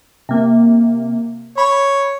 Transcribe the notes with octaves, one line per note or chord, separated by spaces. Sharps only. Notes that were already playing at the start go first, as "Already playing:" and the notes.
C3 A#3
C#5 B5